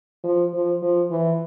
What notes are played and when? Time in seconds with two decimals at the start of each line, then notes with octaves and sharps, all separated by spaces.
0.24 F3
0.53 F3
0.82 F3
1.11 E3